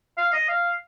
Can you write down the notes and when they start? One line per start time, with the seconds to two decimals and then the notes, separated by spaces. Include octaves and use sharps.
0.18 F5
0.33 D#5
0.49 F5